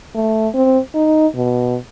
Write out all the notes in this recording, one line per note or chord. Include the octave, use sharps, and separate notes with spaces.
A3
C4
D#4
B2